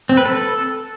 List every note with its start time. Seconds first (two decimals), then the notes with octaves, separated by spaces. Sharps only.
0.09 C4
0.17 B4
0.25 A4